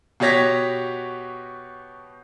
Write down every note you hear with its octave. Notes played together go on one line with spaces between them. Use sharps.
B2 F#4 G4 C#5 A#6 B6